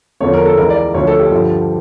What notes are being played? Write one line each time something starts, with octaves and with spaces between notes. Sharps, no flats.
E2 D3 F3 C#5
A#4
A4
C#2 C#3 E3 A#4
D5
D2 D3 F3 C#5
A4
G4
G2 D3 F3